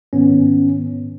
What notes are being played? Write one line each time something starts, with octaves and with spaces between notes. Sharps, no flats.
G#2 D#3 B3 C#4